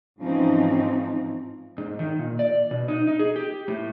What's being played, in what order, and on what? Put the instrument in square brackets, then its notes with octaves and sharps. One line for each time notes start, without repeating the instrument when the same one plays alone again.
[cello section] G#2 E3 F3 C4 C#4 D#4
[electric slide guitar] G#2
D#3
A#2
D5
B2
D#4
D#4
G#4
G4
A2